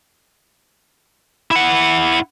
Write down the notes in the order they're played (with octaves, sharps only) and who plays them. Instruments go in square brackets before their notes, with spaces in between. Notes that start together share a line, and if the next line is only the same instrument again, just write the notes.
[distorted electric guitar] E4 F#5